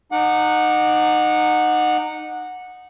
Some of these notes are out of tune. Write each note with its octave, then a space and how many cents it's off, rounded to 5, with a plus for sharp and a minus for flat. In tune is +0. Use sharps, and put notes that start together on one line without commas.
D#4 -20 F#5 -15 D6 +0